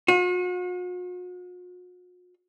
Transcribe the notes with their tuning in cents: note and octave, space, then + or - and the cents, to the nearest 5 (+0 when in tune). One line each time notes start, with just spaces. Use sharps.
F#4 -45